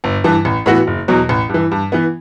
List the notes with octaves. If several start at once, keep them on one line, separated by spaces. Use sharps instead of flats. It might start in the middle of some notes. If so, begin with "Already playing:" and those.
G1
G2 E3
A1
A2 E3 B3 F#4
F#1
E2 B2 F#3
A1
G2 E3
G2
E3 B3